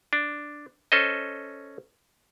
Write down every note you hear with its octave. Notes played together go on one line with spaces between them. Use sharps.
D4
C#4 A4 C5 D#5